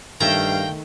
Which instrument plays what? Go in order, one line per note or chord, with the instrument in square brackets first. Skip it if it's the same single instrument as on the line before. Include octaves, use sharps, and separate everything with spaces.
[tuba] G2 [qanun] D#3 A3 E5 [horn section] F5 G5 [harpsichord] A#5